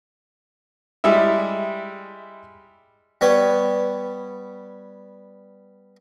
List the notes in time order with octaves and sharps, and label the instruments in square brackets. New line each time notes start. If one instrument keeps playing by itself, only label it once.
[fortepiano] G3 G#3 E4 E5
[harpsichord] G3 B3 C#5 D5